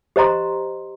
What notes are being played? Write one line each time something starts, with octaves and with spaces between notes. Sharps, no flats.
G4 C5 D#5 A#5 C6